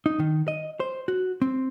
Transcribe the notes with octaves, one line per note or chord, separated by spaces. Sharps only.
D#4
D#3
D#5
C5
F#4
C4